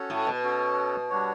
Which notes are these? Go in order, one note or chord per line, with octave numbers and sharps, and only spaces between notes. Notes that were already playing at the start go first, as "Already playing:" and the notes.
Already playing: C#4 F#4 A4 C#5
A2
B2
C#4 F#4 A4 C#5
G3 D4 F#4 C#5